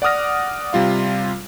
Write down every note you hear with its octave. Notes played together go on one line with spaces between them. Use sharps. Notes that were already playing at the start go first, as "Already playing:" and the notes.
D5 F#5 D6 D#6 F6 A#6
C3 G3 F4 F5